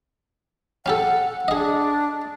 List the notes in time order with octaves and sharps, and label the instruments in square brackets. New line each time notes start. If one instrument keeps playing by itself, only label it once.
[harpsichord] C#4 G4 A4 [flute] F#5
[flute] D4 [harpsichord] G#4 D#5